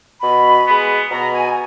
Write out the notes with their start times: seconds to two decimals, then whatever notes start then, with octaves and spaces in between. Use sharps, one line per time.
0.22 B2 B5
0.66 G#3 B3
1.11 B2 A#5
1.34 G#5